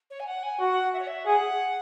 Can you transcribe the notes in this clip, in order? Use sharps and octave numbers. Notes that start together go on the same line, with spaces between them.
C#5
G#5
F#5
G#5
F#4 F#5
E5
C#5
E5
G#4 F#5